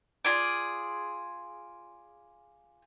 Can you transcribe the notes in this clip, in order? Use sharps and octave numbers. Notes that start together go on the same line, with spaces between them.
F4 G#4 D5